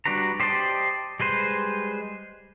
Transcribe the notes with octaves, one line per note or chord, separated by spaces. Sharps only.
G3 D4 F#4 B4 A#5
G4 C5 D5 D#5 A5
G3 G#3 B4 C5